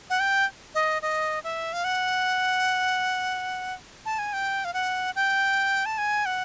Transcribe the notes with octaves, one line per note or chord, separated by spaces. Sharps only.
F#5
G5
D#5
D#5
E5
F5
F#5
A5
G#5
G5
F5
F#5
G5
A5
G#5
F#5